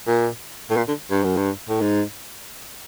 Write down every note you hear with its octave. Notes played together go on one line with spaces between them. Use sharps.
A#2
A2
A#2
D3
G2
F#2
G2
A2
G#2